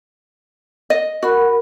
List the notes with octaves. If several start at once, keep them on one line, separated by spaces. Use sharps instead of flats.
D#5
F#4 A#4 B5